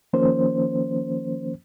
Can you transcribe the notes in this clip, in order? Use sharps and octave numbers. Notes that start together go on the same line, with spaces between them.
D#3 F3 A#3 C#4 C5